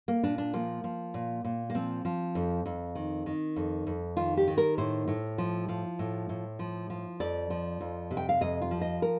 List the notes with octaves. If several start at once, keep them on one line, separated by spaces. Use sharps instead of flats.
A#3
A#2 D4
D4
F3 A#3
F3
A#2
A#2
A#3
F3 C4
F3
F2
F2
D#3
D#3
F2
F2
D#3 F4
G4
D#3
A#4
A2 C5
A2
F3
F3
A2
A2
F3
F3
F2 D5
F3
F2
C3
G5
F5
F2 D#5
F4
F3
D#5
A#4